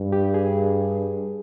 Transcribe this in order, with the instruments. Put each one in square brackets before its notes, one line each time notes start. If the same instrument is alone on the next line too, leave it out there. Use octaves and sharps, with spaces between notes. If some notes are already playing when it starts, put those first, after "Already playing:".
Already playing: [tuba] G2
[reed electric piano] G4
G#4